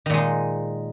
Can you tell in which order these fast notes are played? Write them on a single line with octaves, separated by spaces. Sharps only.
D#3 A#2 G#3 D#4